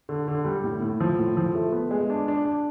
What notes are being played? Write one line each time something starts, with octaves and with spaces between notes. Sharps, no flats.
D3
D3
G3
A2
A2
F3
A2
F3
A3
B3
G#3
D4
D4
D4